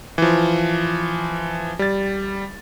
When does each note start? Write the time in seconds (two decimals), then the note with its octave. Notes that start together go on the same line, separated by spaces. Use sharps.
0.18 E3 F3
1.79 G3 A6